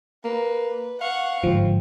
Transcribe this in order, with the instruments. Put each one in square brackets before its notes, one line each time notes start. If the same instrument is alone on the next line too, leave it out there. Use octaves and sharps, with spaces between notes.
[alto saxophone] A#3 [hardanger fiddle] B4
[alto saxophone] F5 [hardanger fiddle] F#5 C#6
[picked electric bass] G1 G#2 [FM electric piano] F3 [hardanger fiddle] C4